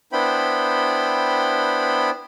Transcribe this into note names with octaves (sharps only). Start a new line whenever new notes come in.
B3 D4 E4 C5 G5 B5